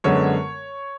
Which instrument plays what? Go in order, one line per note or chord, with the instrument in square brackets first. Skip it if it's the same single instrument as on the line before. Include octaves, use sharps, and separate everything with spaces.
[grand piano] F#2 D3 G#3 B3 C#5